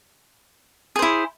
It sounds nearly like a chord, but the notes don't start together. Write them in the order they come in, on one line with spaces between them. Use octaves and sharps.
G#4 C5 E4